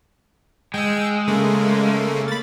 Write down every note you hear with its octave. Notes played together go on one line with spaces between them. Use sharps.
G#3 G5 E6
C#3 A3 A#3
B5 A6